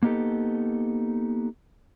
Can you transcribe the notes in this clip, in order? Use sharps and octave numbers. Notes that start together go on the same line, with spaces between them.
A#3 B3 D#4 G4 A4